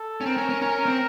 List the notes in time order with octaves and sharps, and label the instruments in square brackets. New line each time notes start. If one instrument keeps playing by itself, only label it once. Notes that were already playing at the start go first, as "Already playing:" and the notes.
Already playing: [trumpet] A4
[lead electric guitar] C#4
[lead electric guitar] C4 [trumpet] A#4
[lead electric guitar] C#4
C#4
[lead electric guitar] C#4 [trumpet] A#4
[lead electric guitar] C4